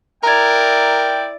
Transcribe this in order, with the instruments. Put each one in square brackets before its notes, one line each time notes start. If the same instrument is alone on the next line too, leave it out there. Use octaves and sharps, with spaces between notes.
[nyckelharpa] E4 D5 [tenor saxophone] A#4 [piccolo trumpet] G5 [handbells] A#5 G#6